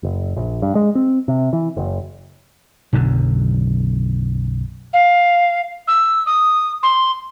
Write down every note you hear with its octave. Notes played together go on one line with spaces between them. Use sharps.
F#1
A#1
G2
G#3
C4
C3
E3
F#1
B1 F#2 D3
F5
E6
D#6
C6